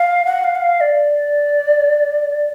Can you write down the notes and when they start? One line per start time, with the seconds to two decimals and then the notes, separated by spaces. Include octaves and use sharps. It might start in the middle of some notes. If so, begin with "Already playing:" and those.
Already playing: F5
0.25 F#5
0.44 F5
0.56 F#5
0.62 F5
0.81 D5